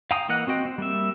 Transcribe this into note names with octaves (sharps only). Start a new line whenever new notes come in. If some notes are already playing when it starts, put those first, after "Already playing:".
F5 G5 G#5 A#5 D#6
E3 A#3 D#5 F#5 F#6
C4 F#4 D#5 G5
C4
G3 A#3 E5